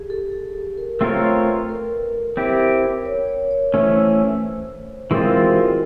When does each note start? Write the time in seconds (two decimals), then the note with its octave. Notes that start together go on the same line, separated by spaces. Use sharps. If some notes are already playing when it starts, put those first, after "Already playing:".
Already playing: G4 G#4
0.10 A4
0.32 G#4
0.55 A4
0.78 A#4
1.01 A3 C4 F4 A4 A#4 C#5
1.46 B4
1.69 A#4
2.37 C4 E4 G4
3.05 C#5
3.28 C#5
3.51 C#5
3.74 E3 A3 C#4 C5
5.11 E3 G#3 C4 F4 A#4
5.33 F#4
5.56 E4